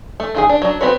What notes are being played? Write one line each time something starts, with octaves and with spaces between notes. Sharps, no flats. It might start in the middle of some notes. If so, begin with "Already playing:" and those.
A3
D#3 F4 G#4
D4
F#3 D4
B3 C4 F#4 B4 C#5